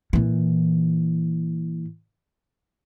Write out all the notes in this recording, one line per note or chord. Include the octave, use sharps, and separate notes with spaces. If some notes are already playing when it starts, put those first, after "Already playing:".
A#2 E3